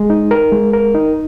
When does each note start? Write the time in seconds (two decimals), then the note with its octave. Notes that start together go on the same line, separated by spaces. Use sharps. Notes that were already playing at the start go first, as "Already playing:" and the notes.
Already playing: G#3
0.10 D#4
0.31 A#4
0.52 G#3
0.73 A#4
0.94 D#4